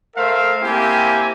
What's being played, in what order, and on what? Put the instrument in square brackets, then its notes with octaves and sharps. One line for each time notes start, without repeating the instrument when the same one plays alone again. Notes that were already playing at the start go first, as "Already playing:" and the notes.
[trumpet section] A3 A#4 C5 E5 F5
A#3 C4 E4 G4 G#5